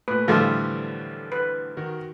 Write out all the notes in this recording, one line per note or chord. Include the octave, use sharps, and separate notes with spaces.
A#2 A3 B4
A2 D3 E3 F3 G3 A3 F4
B4
D#3 F#4 A#4